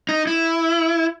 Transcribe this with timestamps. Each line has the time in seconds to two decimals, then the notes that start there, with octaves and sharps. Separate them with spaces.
0.09 D#4
0.27 E4